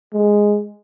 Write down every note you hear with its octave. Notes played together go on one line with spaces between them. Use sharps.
G#3